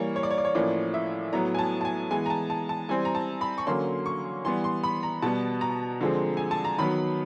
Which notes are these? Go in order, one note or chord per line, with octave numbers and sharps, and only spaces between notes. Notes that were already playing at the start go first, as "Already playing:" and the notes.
Already playing: E3 G3 A#3 C#5
C#5
D5
C#5
D5
C#5
A2 F3 A#3 C#4 D5
E5
A2 F#3 B3 A#5
G#5
A5
A5
G#5
E3 G#3 B3 G#5
A#5
A5
A5
A5
E3 G3 C4 G#5
A#5
A5
B5
C#6
D3 F#3 A#3 C#4 C6
C#6
E3 G3 B3 C6
C6
B5
A#5
B2 G3 B3 A5
A#5
D3 F3 G#3 C4
G#5
A5
A#5
D#3 F#3 B3 B5